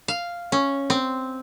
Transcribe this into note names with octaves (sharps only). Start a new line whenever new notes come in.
F5
C#4
C4